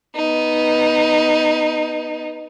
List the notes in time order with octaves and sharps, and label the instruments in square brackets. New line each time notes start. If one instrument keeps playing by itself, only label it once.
[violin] B3 D#4